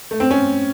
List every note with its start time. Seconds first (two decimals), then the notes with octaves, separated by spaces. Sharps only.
0.11 A3
0.20 C4
0.31 C#4